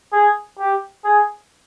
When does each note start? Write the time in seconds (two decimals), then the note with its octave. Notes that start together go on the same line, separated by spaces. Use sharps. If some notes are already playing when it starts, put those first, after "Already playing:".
0.12 G#4
0.58 G4
1.04 G#4